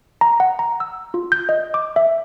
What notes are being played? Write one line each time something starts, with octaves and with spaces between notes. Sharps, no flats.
A#5
F#5
A#5
E6
F4
G6
D#5
D6
E5